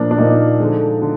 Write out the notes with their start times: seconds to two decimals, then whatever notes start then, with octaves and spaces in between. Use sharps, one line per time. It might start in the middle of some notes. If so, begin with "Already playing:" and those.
Already playing: A#2 F3 A#3 D4
0.11 D4
0.18 A#2 F3 A#3 D#4
0.59 D3 F3 G#3
1.02 D3